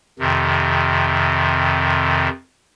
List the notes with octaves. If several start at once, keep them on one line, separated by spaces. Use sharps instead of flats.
F2 C3 D#3